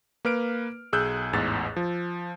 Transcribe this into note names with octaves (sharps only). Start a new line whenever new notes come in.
A#3 B4 F6 D7
B1 G#4 E6 F#6 G6
A1 E2 G#2 A6
F3